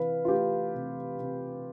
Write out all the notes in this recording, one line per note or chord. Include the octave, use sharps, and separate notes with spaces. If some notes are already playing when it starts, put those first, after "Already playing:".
Already playing: C3 E3 B4 F5
F4
A3 G4
C3
C3